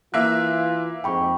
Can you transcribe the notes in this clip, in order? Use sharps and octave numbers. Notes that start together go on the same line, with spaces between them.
E3 A#3 F4 E5 F#6
F2 G#2 G5 B5 C#6